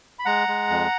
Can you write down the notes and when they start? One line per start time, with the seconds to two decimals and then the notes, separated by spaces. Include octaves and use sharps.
0.19 B5
0.25 G#3 F#5 A#5
0.48 G#3
0.70 F2